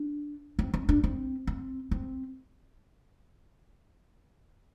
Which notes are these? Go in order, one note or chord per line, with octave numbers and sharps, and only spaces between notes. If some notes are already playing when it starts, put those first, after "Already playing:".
Already playing: D4
C4
C4
D4
C4
C4
C4